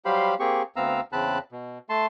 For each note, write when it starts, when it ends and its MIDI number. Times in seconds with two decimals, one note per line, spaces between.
0.05 0.35 54
0.05 0.35 55
0.05 0.35 67
0.05 0.35 72
0.05 0.35 77
0.05 0.35 83
0.40 0.62 58
0.40 0.62 60
0.40 0.62 67
0.40 0.62 68
0.40 0.62 85
0.76 1.01 38
0.76 1.01 59
0.76 1.01 60
0.76 1.01 77
0.76 1.01 82
0.76 1.01 88
1.12 1.38 40
1.12 1.38 49
1.12 1.38 60
1.12 1.38 81
1.12 1.38 83
1.12 1.38 90
1.52 1.78 47
1.89 2.06 57
1.89 2.06 81
1.89 2.06 84